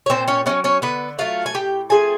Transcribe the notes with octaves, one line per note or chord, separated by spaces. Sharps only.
C#5
A#2 C4 C5
C#4 C#5
F#3 B3 C#4 C#5
C#4 C#5
D3 B3 B4
F#3 A3 F4 F5
G#5
A2 G4 G5
F3 A3 C4 G#4 G#5